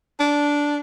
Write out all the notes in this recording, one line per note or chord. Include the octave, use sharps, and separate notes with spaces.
D4